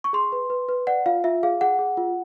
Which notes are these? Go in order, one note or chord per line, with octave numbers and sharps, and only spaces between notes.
C#6
G#4 C6
B4
B4
B4
D5 F#5
F4 F5
F4 E5
G#4 F5
G#4 F#5
G#4
F4